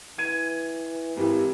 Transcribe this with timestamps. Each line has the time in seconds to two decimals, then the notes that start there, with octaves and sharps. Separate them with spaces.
0.18 E3 G#6 D#7
1.17 G#1 E3 G4